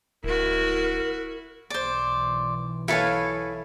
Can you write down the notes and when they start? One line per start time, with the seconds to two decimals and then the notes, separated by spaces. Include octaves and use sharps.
0.24 D1 E4 F#4 A#4
1.70 B1 E3 C5 D5
2.88 E4 A4 B4 C#5 F5 G#5